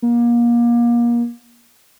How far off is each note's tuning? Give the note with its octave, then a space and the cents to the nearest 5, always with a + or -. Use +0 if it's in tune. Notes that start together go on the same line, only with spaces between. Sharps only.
A#3 +30